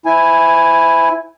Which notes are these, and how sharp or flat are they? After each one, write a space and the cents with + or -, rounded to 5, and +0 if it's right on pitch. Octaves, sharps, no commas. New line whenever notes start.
E4 +0 C5 -40 G#5 +0